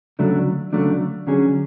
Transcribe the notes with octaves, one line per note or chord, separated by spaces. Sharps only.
D2 C#3 F#3 A3 D4
D2 C#3 F#3 A3 D4
D3 F#3 C#4 G#4